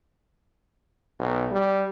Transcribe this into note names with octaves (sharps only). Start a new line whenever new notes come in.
B1
G3